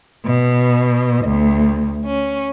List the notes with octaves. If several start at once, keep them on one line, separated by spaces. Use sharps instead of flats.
B2
D2
C#4